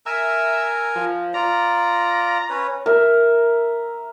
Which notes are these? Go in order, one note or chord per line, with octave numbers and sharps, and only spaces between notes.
A#4 E5 G#5 A#5
F3
F4 D5 A#5
C#4 B4 C#5
A#4 E5